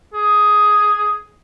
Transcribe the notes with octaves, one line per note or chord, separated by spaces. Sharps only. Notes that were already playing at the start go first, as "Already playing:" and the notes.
G#4